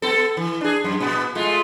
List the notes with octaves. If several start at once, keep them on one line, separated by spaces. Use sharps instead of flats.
B3 A4
E3
D4 G#4
F#2
A#2 B3
G#3 A3 F4